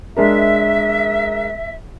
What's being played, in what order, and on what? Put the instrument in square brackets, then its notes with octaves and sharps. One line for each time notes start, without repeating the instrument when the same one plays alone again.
[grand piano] G#3 D4 A#4 [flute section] E5